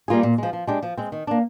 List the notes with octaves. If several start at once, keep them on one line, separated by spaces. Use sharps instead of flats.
G3 A#3 F4 G#4
A#2
F3 G#3
F3
G#3 D4 G4
F3
G#3 C4
D#3
A#3 D4